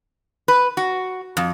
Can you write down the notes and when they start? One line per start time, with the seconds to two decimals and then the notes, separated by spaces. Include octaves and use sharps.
0.48 B4
0.77 F#4
1.37 F2